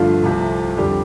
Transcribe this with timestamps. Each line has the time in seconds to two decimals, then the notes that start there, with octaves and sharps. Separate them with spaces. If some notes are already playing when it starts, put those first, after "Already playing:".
Already playing: G2 D3 F3 A3 F4
0.24 C2 C3 F3 A3
0.77 F2 D3 G3 G4